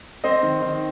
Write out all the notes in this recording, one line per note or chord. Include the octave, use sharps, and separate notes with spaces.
C4 C5 D#5
D#3
D#3